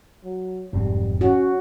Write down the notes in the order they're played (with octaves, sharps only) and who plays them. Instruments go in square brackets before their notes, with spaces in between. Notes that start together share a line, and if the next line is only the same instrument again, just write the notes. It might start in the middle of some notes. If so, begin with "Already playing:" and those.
[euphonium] F#3
[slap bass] E1 F2 C4 [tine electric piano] G#2 [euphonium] G3
[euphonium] C#4 [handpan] F#4